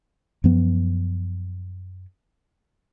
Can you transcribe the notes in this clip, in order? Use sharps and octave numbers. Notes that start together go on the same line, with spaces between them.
F#2 F3 B3